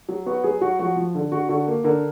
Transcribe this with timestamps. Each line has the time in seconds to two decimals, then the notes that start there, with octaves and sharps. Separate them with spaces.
0.09 F#3
0.26 B3 F#4
0.44 F#3 G#4
0.61 F#3 F#4
0.79 F3 F#4
0.96 F3
1.15 D3
1.32 D3 F#4
1.49 D3 F#4
1.67 A#3
1.84 D3 A#4